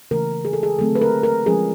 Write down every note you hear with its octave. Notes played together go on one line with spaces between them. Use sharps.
C#3 E3 A3 A#4
G#4
A4
G#4
D3 F#3 A3 C4 A4
B4
A#4
A#4
F3 G#3 C#4 G#4